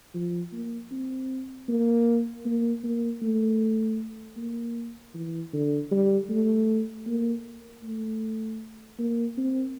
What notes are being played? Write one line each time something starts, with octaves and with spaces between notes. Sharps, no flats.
F3
A#3
C4
A#3
A#3
A#3
A3
A#3
E3
D3
G3
A3
A#3
A3
A#3
C4